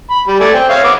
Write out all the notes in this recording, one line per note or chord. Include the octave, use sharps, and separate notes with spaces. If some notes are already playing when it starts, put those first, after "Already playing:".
B5
G3
A3 D5 G#5
C4 G5
C#5 E5 F5
B3 E5 D6